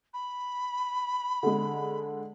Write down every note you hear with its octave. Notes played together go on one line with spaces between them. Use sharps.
B5
D3 G#3